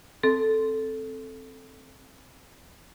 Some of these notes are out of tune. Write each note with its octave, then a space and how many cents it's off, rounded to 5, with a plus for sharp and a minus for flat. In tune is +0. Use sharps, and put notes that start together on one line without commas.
C4 +0 A4 +0